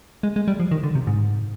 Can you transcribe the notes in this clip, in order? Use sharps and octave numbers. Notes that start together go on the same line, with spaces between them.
G#3
G#3
G3
F3
D#3
D3
C3
G#2